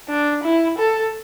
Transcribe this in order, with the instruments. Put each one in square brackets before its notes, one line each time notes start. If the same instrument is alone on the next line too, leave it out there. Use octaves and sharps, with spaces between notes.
[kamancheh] D4
E4
A4